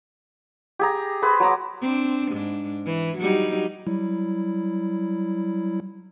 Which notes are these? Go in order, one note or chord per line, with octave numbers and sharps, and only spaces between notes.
G4 G#4 A#5
G#4 B4 C5
F#3 A#5 D6
C4 D4
G#2 D4
E3
F#3 G3 D#4
F#3 G3 E4